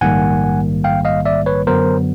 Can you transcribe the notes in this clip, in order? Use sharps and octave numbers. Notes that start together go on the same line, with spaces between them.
A#1 G#2 D#3 G3 A#3 F#5 G#5
F5 G5
D#5 F5
D5 E5
B4 C#5
F#2 D3 F#3 B3 A#4 C5